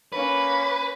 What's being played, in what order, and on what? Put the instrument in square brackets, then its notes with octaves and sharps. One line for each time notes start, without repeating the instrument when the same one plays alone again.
[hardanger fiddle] A#3 C#4 [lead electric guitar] B4